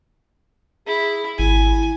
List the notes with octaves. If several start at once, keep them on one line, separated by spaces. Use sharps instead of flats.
E4 G#4
G#1 E4 G#5